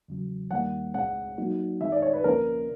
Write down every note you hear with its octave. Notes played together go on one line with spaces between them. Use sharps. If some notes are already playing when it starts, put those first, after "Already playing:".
E2 C#3 F#3
D#2 D#3 G3 A#3 F#5
C#2 B2 G#3 C4 F#5
F#3 A#3 D#4 F#4
D#3 G#3 C4 D#4 E5
D5
C#5
B4
D2 C3 F3 A#3 C#4 A#4